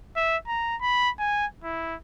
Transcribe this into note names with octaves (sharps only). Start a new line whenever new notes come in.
E5
A#5
B5
G#5
E4